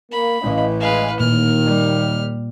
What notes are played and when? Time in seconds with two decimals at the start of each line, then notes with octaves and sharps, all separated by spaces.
0.12 A#3 B5
0.41 A1 E3 C#4 D#5 F5
0.80 G#3 B4 F5 G#5
1.20 D#2 A#2 D#3 F6
1.66 G3